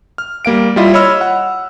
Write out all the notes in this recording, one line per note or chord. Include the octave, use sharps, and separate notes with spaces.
F6
G3 A#3 F5 D7
G3 E4 F4 D#5
C#5 D#5 B5 E6 F6
F#5